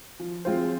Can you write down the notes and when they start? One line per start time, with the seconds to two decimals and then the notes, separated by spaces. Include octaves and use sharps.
0.20 F3
0.45 G#3 C4 F4 C5